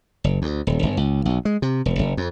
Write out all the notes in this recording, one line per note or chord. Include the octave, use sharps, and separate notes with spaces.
F#1
D2
D#1
G1
C#2
B1
G#3
C3
E1
F#1
F2